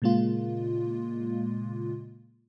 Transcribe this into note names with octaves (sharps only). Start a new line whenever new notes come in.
A#2 C#3 G#3 A#3 F4